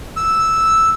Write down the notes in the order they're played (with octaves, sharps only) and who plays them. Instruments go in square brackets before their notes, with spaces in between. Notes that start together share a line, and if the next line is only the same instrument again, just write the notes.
[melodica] E6